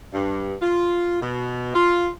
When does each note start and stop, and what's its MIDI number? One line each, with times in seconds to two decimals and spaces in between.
0.13 0.53 43
0.61 1.18 65
1.21 1.71 47
1.74 2.09 65